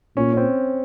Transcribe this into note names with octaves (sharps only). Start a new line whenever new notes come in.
A#2 C#4
C#4
C4